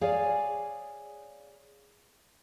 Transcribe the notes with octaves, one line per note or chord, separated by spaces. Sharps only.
G#4 C#5 D5 F5 G#5